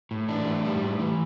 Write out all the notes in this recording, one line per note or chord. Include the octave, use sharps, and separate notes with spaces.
A2
E3 D4
A2
G3
A2
E3